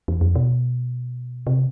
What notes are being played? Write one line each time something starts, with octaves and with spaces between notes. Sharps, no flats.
E2
F2
B2
C3